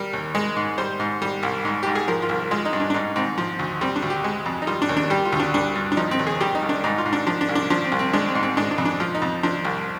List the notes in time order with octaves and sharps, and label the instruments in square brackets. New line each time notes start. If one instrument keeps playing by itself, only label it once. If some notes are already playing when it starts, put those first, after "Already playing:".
Already playing: [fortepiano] G3 A#4
D#2
G#3
G#2
G3 C5
G#2
G3
C2
G#2
G#2 G4
G#4
F3 A#4
F4
C2
G#3 F4
D#4
G2
D4
D4
G#2 D#4
G#2 C4
F3
D2
G3 C4
D4
D2
G4
G#3
F2
D#4
G3 F4
D4
D#2
D4
G3 G4
F4
D2
D4
G3 D4
G2
D4
F3 D#4
C4
D#2
G#4
G3 G4
D#4
C2
D4
G#2 D#4
F4
G#2
D4
F3 D4
D4
C2
D4
F3 D4
C4
C2
C4
G#3 D4
C4
G#2
C4
G#3 D4
D4
F2
D4
F3 F4
D#4
F2
F3 D4
C2